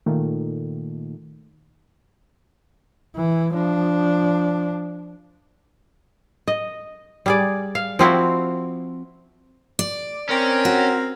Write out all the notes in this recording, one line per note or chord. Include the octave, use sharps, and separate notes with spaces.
A#2 D#3 A3
E3
F3 D4
D#5
G3 G#4 D5
F5
F3 C4 E4 F#4
D5
C4 C#4 A#4
F#4